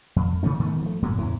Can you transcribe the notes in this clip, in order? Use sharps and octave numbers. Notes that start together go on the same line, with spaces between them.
F2
C3 E3 A3 C#4
G#2 D#3 A3 B3
F3 A3
G2 A#2 D3 F#3
E2 A2 C#3 E3